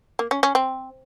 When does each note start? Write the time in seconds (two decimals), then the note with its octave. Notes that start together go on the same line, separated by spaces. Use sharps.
0.19 A#3
0.31 C#4
0.43 C#4
0.55 C4